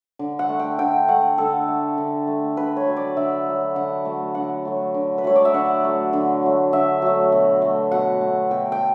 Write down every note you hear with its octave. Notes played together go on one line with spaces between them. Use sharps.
D3
F#5
A3
G5
D3 G5
A3 F#5
D3 A4
A3
D3
A3
D3 B4
C#5
F#3 A3
D5
D3 E5
F#3 A3
D3 F#5
F#3 A3
D3 F#5
F#3 A3
D3
B4
F#3 A3 C#5
D5
E5
D3 F#5
F#3 A3
D3
F#3 A3
D3 E5
F#3 A3
B2
A3
B2 F#5
A3
B2 G5
G5